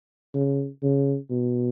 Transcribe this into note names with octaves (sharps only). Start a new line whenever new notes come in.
C#3
C#3
B2